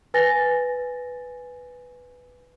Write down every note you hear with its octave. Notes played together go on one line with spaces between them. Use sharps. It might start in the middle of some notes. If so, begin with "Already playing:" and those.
B4 G#5 A6 A#6